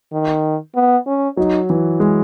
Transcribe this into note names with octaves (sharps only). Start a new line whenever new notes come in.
D#3
B3
C#4
F#3 D#4
E3
G#3